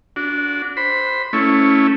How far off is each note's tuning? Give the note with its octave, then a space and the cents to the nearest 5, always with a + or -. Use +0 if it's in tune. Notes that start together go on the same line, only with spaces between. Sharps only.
D4 -25 F#4 -15
C5 +0 B5 +5
A3 +5 C#4 +0 E4 -15